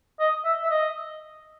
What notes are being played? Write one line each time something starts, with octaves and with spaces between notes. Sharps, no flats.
D#5
E5
E5
D#5